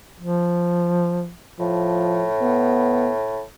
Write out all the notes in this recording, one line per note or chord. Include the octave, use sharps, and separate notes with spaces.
F3
A2 F3
B3